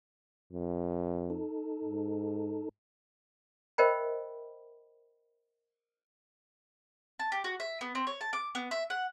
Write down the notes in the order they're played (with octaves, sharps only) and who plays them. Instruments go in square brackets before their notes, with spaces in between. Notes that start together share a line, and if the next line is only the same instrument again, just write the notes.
[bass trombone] F2
[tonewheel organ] D#4 A4
[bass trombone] G#2
[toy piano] A#4 C5 D#5 E5 G5 B5
[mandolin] A5
G4
F#4
E5
B3
C4
C#5
A5
D6
B3
E5
F#5